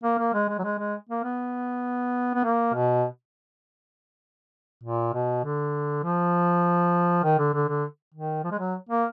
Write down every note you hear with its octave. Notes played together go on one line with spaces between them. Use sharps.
A#3
A#3
G#3
G#3
F#3
G#3
G#3
A#3
B3
B3
A#3
B2
A#2
B2
D3
F3
D#3
D3
D3
D3
D#3
F3
G#3
F#3
A#3